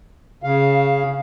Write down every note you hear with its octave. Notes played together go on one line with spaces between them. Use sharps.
C#3 F5